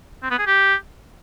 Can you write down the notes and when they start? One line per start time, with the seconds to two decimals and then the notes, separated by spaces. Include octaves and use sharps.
0.23 C4
0.31 B3
0.39 G#4
0.46 G4